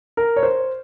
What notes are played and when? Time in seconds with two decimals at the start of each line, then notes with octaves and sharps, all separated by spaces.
0.17 A#4
0.36 C#5
0.43 C5